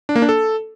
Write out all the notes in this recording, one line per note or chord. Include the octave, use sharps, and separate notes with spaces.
D4
A#3
D4
A4